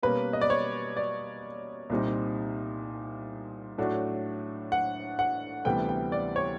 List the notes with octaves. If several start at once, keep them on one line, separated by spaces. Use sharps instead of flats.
B2 G3 A#3 C#4 B4
D#5
D5
C#5
D5
C2 A#2 G3 C4 D#4
A2 F#3 A3 D4 F#4
F#5
F#5
D2 C3 E3 G3 B3 G5
G5
D5
C#5